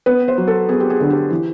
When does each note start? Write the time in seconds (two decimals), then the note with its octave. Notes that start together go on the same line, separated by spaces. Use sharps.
0.06 B3 B4
0.28 C5
0.38 F#3
0.47 A4
0.69 B3 G#4
0.80 G4
0.90 G#4
1.00 D3
1.10 G4
1.30 E3